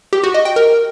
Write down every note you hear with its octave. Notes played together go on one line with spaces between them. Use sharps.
G4
F#4
D#5
G5
A#4